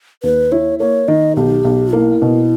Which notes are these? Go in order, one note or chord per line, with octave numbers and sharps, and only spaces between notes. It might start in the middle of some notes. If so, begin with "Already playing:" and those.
D#2 B4
E4 C#5
A#3 C#5
D#3 D#5
B1 G4
B1
A#3 E4
B2